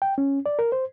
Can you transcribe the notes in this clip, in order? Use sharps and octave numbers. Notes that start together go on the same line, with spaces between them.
G5
C#4
D5
A#4
C5